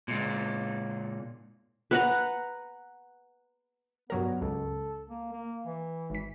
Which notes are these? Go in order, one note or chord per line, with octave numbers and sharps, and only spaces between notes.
A#2 G#3
B4 F#5 A#5
G2 F#3 B3 A#4
C#2 A4
A#3
A#3
E3
G#1 B6